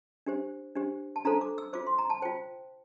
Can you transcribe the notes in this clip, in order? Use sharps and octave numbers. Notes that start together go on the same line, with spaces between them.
D4 G4 C5
D4 G4 C5
A5
D4 F4 A4 C5 A#5
D6
E6
F4 C5 D6
C6
A#5
A5
F4 C5 G5